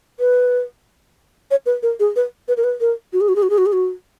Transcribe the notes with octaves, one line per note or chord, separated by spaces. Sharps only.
B4
C#5
B4
A#4
G#4
B4
B4
A#4
B4
A#4
F#4
G#4
F#4
G#4
F#4
G#4
F#4
G#4
F#4